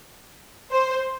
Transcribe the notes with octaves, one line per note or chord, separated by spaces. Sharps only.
C5